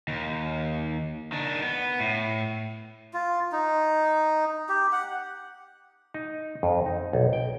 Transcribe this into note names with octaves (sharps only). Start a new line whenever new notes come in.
D#2
D#3 D4
B3
A2
F4
D#4
G4
F#5
D#4
F2
D#4
B1
G5